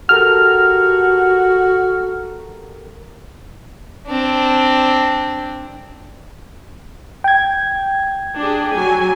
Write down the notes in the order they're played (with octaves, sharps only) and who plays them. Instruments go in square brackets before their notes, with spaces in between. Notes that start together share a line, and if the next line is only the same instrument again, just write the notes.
[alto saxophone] F#4 [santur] G4 A4 A#4 [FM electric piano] F6
[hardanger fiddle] C4 D4
[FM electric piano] G5 G#6
[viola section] D4 G4 G#4
F#3 G#5